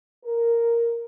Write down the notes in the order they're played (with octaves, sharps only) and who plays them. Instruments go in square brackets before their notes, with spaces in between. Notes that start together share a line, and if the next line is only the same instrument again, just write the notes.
[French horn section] A#4